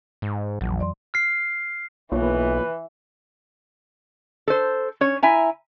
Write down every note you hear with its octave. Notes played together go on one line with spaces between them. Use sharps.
G#2
A#1 F2 E3 F#3
D5 C6
F6 C7
B1 E3 A#3 F4 B4 C#5
A4 C5
C#4 C#5
E4 E5 G#5 A#5